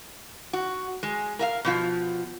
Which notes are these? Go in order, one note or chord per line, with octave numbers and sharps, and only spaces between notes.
F#4
G#3
A#4 E5 F5
B2 F3 F4